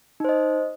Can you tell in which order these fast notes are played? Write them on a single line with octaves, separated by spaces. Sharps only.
D#4 C5 D#5